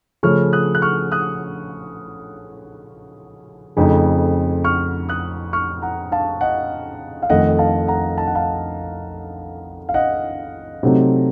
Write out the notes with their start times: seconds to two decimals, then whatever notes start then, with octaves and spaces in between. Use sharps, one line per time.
0.23 C#3 F3 A3 C#4 C#6 F6
0.53 D#6 F#6
0.75 F#6
0.82 C#6 F6
1.12 D#6 F#6
3.77 F2 C#3 A3 C4 D#4
4.64 C#6 F6
5.09 D#6 F#6
5.53 C#6 F6
5.82 F#5 A#5
6.12 F5 A5
6.41 D#5 F#5
7.22 F5
7.30 F2 D#3 A3 D#5 F#5
7.59 F5 A5
7.88 F#5 A#5
8.18 A5
8.27 F#5
8.35 F5 A5
9.89 F5
9.94 D#5 F#5
10.83 C3 F#3 A3 C4 D#4